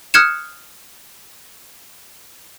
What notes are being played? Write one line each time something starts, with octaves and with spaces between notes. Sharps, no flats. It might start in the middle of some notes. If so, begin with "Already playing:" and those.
D#6 F6 F#6 G#6 C#7 E7